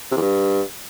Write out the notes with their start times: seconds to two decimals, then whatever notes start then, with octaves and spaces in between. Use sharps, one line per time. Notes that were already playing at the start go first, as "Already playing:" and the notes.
0.11 C3
0.16 E2
0.21 G2